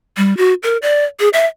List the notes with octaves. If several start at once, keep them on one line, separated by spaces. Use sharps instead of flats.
G3
F#4
A#4
D5
G#4
E5